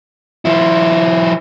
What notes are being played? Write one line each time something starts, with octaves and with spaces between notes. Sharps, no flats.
F3 E4